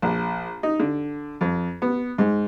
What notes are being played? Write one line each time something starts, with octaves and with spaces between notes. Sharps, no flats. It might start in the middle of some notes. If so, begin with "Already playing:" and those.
A#1
D#4
D3
F2
B3
G#2